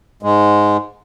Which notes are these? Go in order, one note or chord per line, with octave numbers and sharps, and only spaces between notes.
G#2 G#3